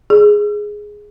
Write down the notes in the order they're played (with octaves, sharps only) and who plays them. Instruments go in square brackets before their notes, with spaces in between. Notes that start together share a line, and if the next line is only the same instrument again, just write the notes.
[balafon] G#4